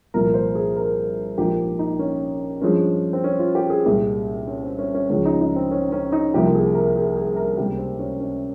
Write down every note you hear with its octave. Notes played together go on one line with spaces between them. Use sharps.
C2 A#2 F3 A#4
C5
G#4
A#4
A#1 G#2 F3 A#3 G4
D#4
C#4
G2 F3 G#3 C#4
C4
C#4
F4
G4
G#4
C2 A#2 G#3 G4
C#4
C4
C#4
C#4
C#2 C#3 F3 G#3 C#4
D#4
D#4
C4
C#4
C#4
D#4
C2 C3 F3 A#3 G4
G#4
A#4
G#4
G#4
A#4
C#2 C3 G3 A#3 G4
C4
C#4
C#4